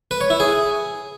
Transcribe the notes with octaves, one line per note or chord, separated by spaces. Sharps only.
B4
C#5
E4
G#4